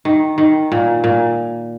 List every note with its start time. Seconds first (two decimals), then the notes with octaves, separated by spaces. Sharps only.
0.05 D#3
0.38 D#3
0.72 A#2
1.04 A#2